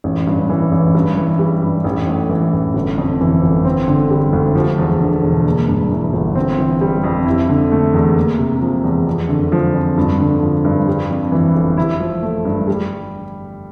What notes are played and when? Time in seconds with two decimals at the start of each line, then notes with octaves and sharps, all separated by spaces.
0.04 A1
0.27 G2
0.50 E3
0.72 A1
0.95 G2
1.17 E3
1.39 G3
1.62 G2
1.84 A1
2.07 A2
2.29 E3
2.53 A1
2.74 G1
2.98 F2
3.21 E3
3.42 G1
3.65 C4
3.88 D3
4.10 G3
4.33 D2
4.55 F3
4.78 E2
5.00 D3
5.23 E1
5.46 A#3
5.68 G2
5.91 E3
6.13 G1
6.35 C4
6.58 E3
6.81 G3
7.04 F2
7.26 E4
7.49 D3
7.72 A3
7.94 E2
8.16 A#3
8.39 C3
8.61 F3
8.84 E2
9.07 F2
9.29 D3
9.52 F3
9.75 F2
9.98 G2
10.20 D3
10.42 F3
10.65 G2
10.88 G3
11.10 F2
11.32 E3
11.55 G1
11.77 E4
12.00 F3
12.22 A3
12.45 G2
12.67 G3